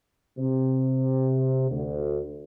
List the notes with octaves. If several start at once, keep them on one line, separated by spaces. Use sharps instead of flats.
C3
D2